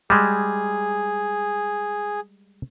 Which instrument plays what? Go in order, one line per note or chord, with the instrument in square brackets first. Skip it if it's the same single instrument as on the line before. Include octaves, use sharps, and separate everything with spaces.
[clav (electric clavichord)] G3 G#3 [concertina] G#4